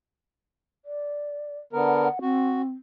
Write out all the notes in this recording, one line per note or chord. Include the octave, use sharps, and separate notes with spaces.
D5
D3 B3 A#4 F#5
C4 F#4